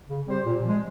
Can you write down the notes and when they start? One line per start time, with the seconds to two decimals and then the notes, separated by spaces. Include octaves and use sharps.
0.09 C#3
0.28 G3 C4 G4 C5
0.45 A#2
0.63 F3 G#3